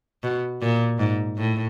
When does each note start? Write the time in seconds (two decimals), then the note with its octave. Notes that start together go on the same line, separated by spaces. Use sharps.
0.23 B2
0.62 A#2
0.99 G#2
1.38 A2